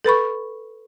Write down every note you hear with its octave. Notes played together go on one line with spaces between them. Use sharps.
A4 B4 B5 C#6